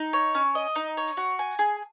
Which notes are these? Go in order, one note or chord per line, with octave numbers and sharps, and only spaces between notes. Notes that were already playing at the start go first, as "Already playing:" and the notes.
Already playing: D#4
C#5
C#4
D#5
D#4
C#5
F#4
G#5
G#4